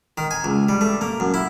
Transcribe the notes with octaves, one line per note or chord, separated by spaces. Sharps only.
D#3
G#5
C#2
G3
A3
A#3
F#2
E4